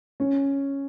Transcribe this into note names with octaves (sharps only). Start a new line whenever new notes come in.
C#4